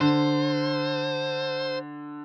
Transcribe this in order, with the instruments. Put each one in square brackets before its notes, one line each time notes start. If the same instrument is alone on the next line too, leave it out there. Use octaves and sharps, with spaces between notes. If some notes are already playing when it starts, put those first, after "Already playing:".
[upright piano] D3 [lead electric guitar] C5